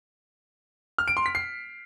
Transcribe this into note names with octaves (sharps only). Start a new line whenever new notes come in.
F6
D7
C6
B6
C7